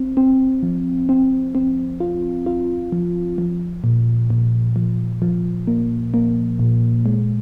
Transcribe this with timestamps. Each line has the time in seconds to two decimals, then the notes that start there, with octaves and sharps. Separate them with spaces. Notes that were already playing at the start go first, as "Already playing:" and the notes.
Already playing: C4
0.17 C4
0.63 F3
1.09 C4
1.55 C4
2.00 F4
2.46 F4
2.92 F3
3.38 F3
3.84 A#2
4.30 A#2
4.76 F3
5.22 F3
5.67 A#3
6.14 A#3
6.60 A#2
7.06 G#3